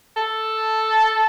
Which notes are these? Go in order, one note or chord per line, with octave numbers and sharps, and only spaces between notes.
A4